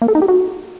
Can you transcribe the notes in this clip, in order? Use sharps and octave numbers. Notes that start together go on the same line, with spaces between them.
A#3
A4
D#4
G4
F#4